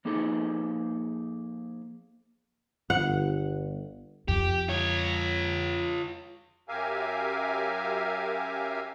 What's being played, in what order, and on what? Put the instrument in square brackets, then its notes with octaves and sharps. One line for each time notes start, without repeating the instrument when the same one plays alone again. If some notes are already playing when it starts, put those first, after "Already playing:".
[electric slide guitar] F3 A#3 D#4 G#4 A4
[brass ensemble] G1 [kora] F#5
[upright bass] F2 [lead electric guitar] G4
[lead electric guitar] F4 C#5
[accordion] F#2 G4 A#4 E5 F5 G#5